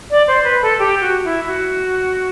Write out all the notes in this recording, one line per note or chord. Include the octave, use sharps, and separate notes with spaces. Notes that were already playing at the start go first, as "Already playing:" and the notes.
D5
C5
B4
A4
G4
F#4
E4
F#4